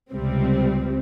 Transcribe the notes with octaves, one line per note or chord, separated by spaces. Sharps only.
C#2 C3 G3 C4